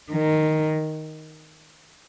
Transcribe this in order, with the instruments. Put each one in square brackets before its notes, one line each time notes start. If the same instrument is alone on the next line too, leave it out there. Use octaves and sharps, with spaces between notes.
[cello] D#3